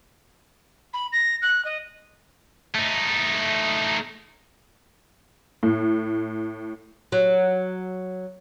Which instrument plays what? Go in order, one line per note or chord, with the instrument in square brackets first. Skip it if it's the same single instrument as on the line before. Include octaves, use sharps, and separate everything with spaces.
[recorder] B5
A#6
F#6
D#5
[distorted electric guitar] A3 D#4
[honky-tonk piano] A2
[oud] F#3